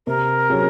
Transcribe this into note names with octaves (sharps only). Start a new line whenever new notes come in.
C3 A#4
F#3 C#4 G#4